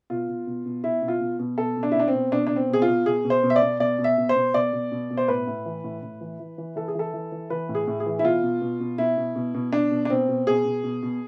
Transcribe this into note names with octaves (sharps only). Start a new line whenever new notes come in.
B2 F4
B2
B2
B2
B2 E4
B2
F4
B2
B2
B2 A4
B2
D4
E4
B2 D4
C4
B2
B2 D4
B2 D4
C4
B2 G#4
F4
B2
B2 G#4
B2
C5
B2
E5
D5
B2
B2 D5
B2
E5
B2
C5
B2
B2 D5
B2
B2
B2
C5
A2 B4
A2
E3
A2
A2
E3
E3
E3
E3 A4
G#4
E3 A4
E3
E3
E3 B4
A2
G#4
A2
G#4
E3
E4
B2 F4
B2
B2
B2
B2 E4
B2
B2
B2
B2 D4
B2
D4
B2 C4
B2
B2 G#4
B2
B2
B2